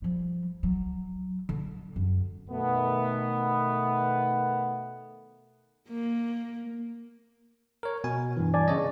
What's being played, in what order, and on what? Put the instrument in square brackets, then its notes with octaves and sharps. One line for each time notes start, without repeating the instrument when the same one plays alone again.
[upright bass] F3 G3
F#3
D3
F#2
[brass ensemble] B2 D#3 A3 B3
[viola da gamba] A#3
[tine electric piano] A#4 C#5
B2 G#5
G2 E3
[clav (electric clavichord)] D5 G#5 A5
[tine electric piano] C#3 C#5 D#5